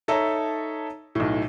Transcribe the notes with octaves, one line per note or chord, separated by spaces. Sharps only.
D#4 A4 C#5 E5 A5 A#5
B1 A2